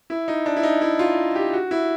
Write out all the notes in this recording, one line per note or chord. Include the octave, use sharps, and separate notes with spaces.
E4
D#4
D4
E4
D#4
E4
F4
G4
F#4
E4